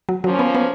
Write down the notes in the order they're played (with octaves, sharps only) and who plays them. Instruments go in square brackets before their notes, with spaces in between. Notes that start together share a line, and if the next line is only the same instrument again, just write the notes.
[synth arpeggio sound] F#3
[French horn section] F3 A#3 C#4 [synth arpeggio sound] F#3
[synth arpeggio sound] B3
B3